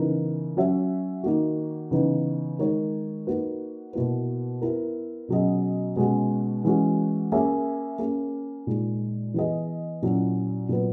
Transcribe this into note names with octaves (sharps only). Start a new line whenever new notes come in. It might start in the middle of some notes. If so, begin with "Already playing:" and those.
Already playing: C#3 E3 B3 D#4 A#4
F#3 C#4 F#4 C#5 E5
D#3 A#3 D#4 F#4
C#3 E3 B3 D#4
D#3 G#3 D#4 A#4 C#5
A#3 D#4 F#4 B4
B2 A#3 E4 B4
B3 E4 A#4
B2 F#3 C#4 G#4 D#5
B2 G#3 C#4 F#4
E3 G#3 C#4 F#4
A#3 C#4 G#4 C#5 E5
A#3 C#4 G#4
A#2 G#3 D#4
E3 B3 E4 G#4 D#5
A#2 F#3 C#4 E4
A#2 F#3 B3